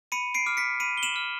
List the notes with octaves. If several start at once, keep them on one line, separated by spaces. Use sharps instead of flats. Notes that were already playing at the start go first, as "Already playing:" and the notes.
B5 C#7 D#7
C7 D7
D6 F6
B6 C#7
B5 C#7 D#7
G7
E7 F#7
D6 F6